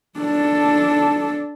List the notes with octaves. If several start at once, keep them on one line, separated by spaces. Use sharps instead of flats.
D4 A4